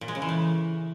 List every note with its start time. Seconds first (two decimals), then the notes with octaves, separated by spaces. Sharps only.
0.01 A#2
0.08 G#3
0.15 C#3
0.22 E3
0.29 A3